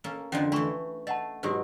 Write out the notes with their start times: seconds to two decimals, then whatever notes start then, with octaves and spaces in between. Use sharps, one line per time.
0.04 A#3 C#4 A4
0.32 F2 D3 F3 C#4
0.52 E3 A3 D4 B5 C#6
1.07 A3 D#5 F#5 A5
1.43 G#2 B2 F#3 F#4 G4 A#4